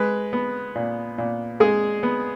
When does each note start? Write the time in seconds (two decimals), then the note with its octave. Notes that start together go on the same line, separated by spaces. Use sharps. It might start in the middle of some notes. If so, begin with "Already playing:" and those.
Already playing: G#3 B4
0.33 B3
0.76 A#2
1.18 A#2
1.60 G#3 G#4
2.03 B3